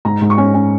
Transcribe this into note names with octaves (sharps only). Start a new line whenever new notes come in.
G#2 A#5
G#2
C#6
C#4
C#4